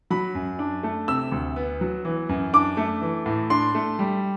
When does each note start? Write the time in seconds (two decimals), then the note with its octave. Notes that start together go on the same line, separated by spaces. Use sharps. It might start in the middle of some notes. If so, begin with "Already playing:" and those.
0.10 F#3 B5
0.35 F#2
0.59 D4
0.83 A3
1.08 C3 E6
1.32 D2
1.56 B3
1.81 F#3
2.05 E3
2.29 F#2
2.53 D4 D6
2.77 A3
3.01 E3
3.26 A2
3.50 D4 C6
3.75 A3
3.99 G3